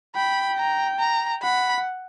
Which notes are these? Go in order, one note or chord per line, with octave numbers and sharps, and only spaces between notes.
G5 B5
A#5
A#5
F#5 B5